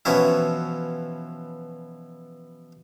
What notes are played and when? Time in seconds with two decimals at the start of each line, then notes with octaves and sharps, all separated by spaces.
0.05 B2 E3 F3 C#4 E4